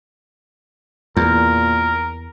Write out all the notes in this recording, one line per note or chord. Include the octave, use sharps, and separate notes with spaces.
E2 A#2 A#4